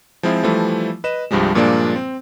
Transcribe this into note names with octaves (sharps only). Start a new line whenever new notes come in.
F3 G#3 C4 E4 F4
E3 F3 G3 A3 E4
B4 D#5 E7
C2 G2 F3 G3 G#3
G2 A#2 F3 G#3 A#3 D4
C4